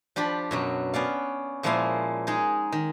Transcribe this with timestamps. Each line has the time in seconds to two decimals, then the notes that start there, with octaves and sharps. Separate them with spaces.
0.16 F3 D4 G4 B5
0.51 F#2 B2 F#3
0.94 B3 C#4 D5 F5
1.63 A#2 F3 G#3 A#3 E4 F5
2.27 G#3 D#4 G#4
2.72 D#3